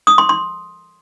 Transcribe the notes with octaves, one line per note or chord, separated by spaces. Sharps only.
D#6
C6
C6